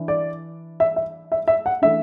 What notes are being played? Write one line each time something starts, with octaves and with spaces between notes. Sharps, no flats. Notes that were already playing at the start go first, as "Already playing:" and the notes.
Already playing: E3 D4
D5
E5
E5
E5
E5
F#5
E3 A3 D4 E5